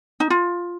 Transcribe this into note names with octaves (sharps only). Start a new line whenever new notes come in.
D#4
F4